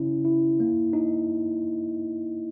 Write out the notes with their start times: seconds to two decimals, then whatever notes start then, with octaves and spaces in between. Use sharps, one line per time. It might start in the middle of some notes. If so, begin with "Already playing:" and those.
Already playing: C#3 C#4 E4
0.25 E4
0.60 A#3
0.93 D#4